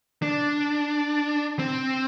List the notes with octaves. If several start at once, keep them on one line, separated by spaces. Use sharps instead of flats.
D4
C4